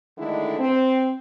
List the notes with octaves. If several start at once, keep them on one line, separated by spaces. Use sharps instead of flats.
D3 D#3 G#3 A3 D4 E4
C4